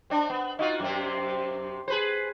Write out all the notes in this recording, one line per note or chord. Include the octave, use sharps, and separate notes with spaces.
C4 D4
B3
D#4 F4 F#4
F#2 C3 C4
G#4 B4 C5